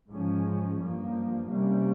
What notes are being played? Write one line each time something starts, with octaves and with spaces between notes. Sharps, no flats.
G#2 F3 G#3 C#4
G2 F3 A#3
C3 G3 A#3 C#4